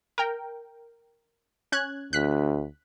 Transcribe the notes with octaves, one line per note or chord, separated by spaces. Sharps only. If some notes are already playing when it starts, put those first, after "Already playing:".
A#4 G5
C#4 F#6 G#6
D2 F#6 B6